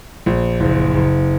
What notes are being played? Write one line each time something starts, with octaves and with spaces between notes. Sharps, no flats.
A#1
F#1
F#1